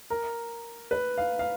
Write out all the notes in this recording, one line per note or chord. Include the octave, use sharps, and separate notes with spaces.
A#4
B4
F5
F5